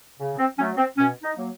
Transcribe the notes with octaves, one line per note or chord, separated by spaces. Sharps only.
C#3
C4
F#3 A3 C#4
C4
B2 C#4
D#4
F#3 A#3